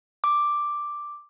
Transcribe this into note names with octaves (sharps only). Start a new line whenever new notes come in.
D6